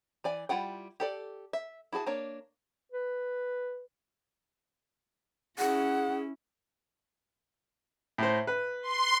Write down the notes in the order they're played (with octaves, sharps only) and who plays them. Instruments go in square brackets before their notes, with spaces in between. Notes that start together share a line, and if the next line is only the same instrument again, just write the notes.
[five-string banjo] E3 D5 G#5
G3 E4 F4 F#5 G5
G4 A4 D5
E5
E4 F#4 G#4 A5
A#3 D4 C#5
[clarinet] B4
[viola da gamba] C#4 E4 [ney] G#4 [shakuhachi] F#5
[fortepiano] A2 C5
B4
[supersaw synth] C6